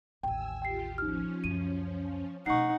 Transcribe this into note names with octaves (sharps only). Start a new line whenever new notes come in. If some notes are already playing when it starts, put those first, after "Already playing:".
A1 D#2 G5 G#5 E6
F4 G4 G5 C7
F3 C#4 D#4 F6
C#2 F#2 D#7
B2 A3 D#4 F#5 C#6 C7